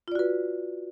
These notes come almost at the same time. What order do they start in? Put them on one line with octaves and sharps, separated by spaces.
F4 D5 F#4 B4